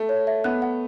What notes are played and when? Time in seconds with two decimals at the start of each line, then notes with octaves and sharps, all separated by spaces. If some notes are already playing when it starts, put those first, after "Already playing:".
Already playing: A3
0.09 C#5
0.27 E5
0.44 B3 F#6
0.62 F#5